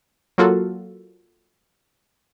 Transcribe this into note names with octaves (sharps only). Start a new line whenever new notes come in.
F#3 A#3 F4 F#4 A4